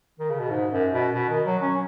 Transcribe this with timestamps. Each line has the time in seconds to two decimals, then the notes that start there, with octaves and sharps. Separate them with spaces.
0.19 D#3
0.30 C#3
0.40 B2
0.50 G#2
0.71 F#2
0.92 B2
1.14 B2
1.29 D#3
1.46 F#3
1.62 C#4